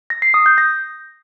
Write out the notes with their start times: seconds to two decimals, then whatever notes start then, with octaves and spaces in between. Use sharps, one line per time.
0.10 A#6
0.22 C7
0.34 D#6
0.46 G6
0.58 A#6